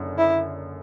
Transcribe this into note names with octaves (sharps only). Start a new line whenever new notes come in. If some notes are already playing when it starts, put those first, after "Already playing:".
Already playing: F#1 F#2 D3
E4